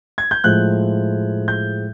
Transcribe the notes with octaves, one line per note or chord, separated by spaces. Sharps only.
G#6
G6
A2 F3 G#3 F#6
G6